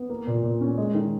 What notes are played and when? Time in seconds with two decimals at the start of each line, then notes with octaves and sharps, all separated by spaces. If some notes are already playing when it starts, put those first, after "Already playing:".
Already playing: B3
0.10 A#3
0.27 A#2
0.43 A#2
0.61 C#4
0.78 G#3
0.94 D#3